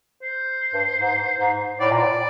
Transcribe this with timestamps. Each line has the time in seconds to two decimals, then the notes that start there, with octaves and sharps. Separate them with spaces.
0.22 C5
0.74 G2
1.01 G#2
1.40 G#2
1.80 A2 D5
1.91 A#2
1.98 D5
2.03 A2